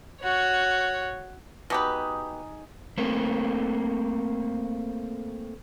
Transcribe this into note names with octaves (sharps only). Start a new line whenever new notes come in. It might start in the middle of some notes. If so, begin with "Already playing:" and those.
F#4 C#5
B2 D#4 G4 G#4 B4 D6
A3 A#3 C4